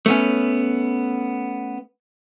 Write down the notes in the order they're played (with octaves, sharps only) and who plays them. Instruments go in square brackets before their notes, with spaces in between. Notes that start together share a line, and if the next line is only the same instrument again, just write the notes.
[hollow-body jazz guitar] A3 B3 C#4